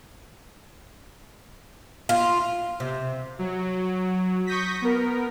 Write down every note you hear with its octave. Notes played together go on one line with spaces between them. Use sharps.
F4
C3
F#3
C#6 D#6 G6 A#6 B6
B3 A#4